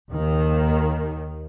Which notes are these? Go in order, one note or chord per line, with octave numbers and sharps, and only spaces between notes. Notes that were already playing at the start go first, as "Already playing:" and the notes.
D#2 D#3